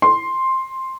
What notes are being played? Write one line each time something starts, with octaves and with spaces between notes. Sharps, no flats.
C6